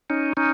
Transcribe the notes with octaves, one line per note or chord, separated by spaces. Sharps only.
C#4 D#4
C#4 D#4